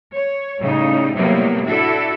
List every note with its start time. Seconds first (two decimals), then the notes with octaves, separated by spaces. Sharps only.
0.11 C#5
0.60 A2 C#3 G3 D#4
1.15 A2 C3 F#3 G3 A#3 B3
1.67 D4 E4 F#4 A4